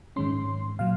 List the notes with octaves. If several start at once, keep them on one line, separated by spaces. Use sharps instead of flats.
G#2 D#3 G#3 C#4 C6
A#2 F#3 F5